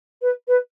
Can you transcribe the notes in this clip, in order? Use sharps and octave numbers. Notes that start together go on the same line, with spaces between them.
B4
B4